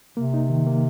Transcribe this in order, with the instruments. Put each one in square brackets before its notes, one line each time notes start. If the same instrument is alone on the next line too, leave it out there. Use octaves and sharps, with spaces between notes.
[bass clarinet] C3 [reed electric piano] A#3
[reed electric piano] D#4
D#3
A#3